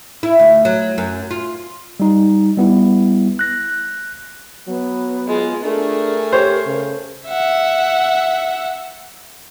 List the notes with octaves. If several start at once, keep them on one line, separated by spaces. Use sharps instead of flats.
E4
D2
F#3
F#2
F4
G3 D#4
G3 B3 E4
F#6 A#6
F#3 B3
G#3 F4
A3 D4 G#4 A#4
G4 C5 C#5
C#3
E5 F#5